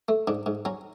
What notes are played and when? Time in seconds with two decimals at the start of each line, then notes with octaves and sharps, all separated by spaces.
0.09 A3
0.28 G#2 D4
0.46 G#2
0.65 F#3 C#4